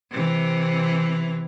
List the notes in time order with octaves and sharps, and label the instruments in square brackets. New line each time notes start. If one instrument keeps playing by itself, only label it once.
[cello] C3 E3